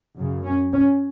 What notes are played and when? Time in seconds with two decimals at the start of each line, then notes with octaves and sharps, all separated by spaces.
0.16 F#2 C#3
0.44 C#4
0.73 C#4